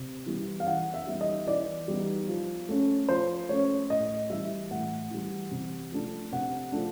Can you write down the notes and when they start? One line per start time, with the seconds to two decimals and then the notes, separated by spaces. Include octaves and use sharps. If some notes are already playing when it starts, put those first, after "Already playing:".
Already playing: C3
0.26 E3 G3 B3
0.60 F5
0.67 E3 F#5
0.94 E5
1.07 G3 B3 D#4
1.21 D#5
1.47 E3 D5
1.88 G3 B3 D#4
2.28 F3
2.69 A3 C#4
3.09 F3 C5
3.49 A3 C#4 C#5
3.89 A2 D#5
4.30 E3 G3 E5
4.71 A2 F#5
5.10 E3 G3
5.51 C3
5.92 F3 A3 D4
6.32 C3 F#5
6.72 F3 A3 D4